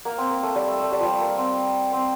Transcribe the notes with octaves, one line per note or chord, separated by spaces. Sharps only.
A#3
C4
A#3
A3
G3
A3
A3
G3
F3
G3
A#3
C4
C4